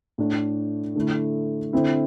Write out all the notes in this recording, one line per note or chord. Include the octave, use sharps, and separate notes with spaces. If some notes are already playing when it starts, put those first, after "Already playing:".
A2 A3 D4
D3 A3 E4
D3 C4 E4